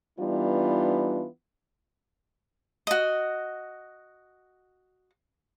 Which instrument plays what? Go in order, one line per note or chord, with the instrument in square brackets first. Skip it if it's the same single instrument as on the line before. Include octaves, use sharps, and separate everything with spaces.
[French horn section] E3 G3 B3 D4 D#4 F4
[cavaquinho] F#4 D#5